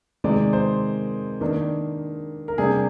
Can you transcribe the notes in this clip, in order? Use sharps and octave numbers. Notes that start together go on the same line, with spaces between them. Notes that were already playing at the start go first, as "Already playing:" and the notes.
C3 D#3 G#3 D5
C5
D#3 A#3 D4
A#4
C3 G3 D4 G#4